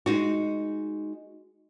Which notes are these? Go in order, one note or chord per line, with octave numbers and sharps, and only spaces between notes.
G#3 D#4 F#4